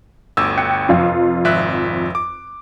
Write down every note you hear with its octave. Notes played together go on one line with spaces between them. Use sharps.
G1 D2 E6
G5 F#6 C#7
F1 F2 F4
G#1 E5 F#6
D6